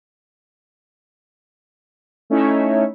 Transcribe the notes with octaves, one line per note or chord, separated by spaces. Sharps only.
A3 C#4 D#4 E4 C#5 E5